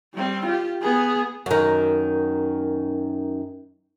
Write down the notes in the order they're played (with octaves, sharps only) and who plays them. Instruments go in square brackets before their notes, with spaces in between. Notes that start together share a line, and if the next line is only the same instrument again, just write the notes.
[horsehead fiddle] G3 C4
F4 G4
B3 G#4
[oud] F#2 D#3